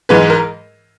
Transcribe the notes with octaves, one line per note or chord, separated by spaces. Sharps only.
G#2 E3 G#3 B4
A#4